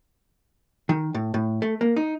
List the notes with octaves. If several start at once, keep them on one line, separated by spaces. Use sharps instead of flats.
D#3
A2
A2
A3
A#3
D#4